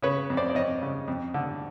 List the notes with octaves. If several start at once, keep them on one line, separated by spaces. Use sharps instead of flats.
C#3 B4 C#5
F2
C5 D5
D5
F2 C#5 D#5
C#3
F2
D3